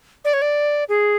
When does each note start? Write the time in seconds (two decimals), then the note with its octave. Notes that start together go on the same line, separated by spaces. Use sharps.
0.25 D5
0.33 C#5
0.42 D5
0.89 G#4